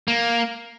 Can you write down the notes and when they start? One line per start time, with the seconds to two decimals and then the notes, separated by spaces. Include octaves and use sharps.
0.08 A#3